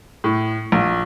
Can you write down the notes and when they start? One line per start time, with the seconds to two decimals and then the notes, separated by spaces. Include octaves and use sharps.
0.24 A2
0.72 A#1